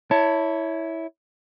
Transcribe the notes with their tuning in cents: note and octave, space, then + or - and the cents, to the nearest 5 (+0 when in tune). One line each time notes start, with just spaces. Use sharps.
E4 -10 C#5 +15 A5 +20